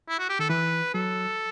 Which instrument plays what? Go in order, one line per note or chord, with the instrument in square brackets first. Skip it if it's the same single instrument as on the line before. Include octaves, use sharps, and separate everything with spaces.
[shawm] E4
F#4
G4
[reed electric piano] D#3 [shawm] A4
[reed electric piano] E3 [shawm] B4
[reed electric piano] F#3 [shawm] A4